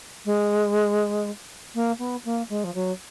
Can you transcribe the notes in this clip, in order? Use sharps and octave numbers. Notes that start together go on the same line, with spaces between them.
G#3
A#3
B3
A#3
G#3
F3
F#3